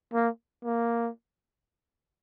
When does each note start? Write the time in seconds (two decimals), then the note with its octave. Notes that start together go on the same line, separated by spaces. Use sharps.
0.14 A#3
0.65 A#3